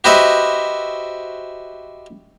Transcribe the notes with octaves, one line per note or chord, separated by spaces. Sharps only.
F#4 G4 B4 C5 D#5 E5